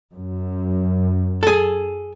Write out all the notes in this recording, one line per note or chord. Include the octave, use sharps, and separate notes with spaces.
F#2
G#4 A4